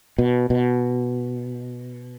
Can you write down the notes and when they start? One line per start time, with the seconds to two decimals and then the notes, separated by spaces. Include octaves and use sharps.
0.18 B2
0.50 B2